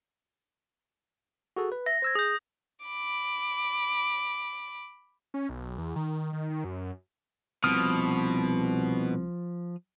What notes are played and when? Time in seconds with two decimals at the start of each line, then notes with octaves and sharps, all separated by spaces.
1.56 F#4 G#4 A4
1.72 B4
1.86 E5 A#6
2.02 C5 E6 G#6
2.15 G#4 D#6 G6
2.86 B5 D6
5.34 C#4
5.49 B1
5.78 E2
5.96 D#3
6.33 D#3
6.50 D#3
6.64 F#2
7.64 C2 B2 F3 D#6 F6